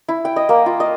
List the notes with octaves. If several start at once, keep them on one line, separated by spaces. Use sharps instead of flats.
E4
G5
D#5
A#3
F4
D#5